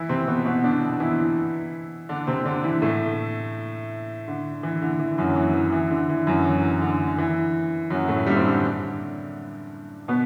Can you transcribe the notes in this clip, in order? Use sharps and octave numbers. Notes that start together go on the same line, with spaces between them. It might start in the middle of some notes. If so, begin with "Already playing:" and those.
Already playing: E3 E4
C3 C4
B2 B3
B2 B3
D3 D4
E3 E4
D3 D4
C3 C4
D3 D4
E3 E4
A2 A3
D3
E3
D3
E3
F#2 F#3
E3
E3
E3
D3
E3
F#2 F#3
E3
D3
E3
F#2 F#3
A2 A3
G2 G3
C4
D3 D4
B2 B3